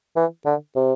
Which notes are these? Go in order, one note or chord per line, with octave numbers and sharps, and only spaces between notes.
E3
D3
C3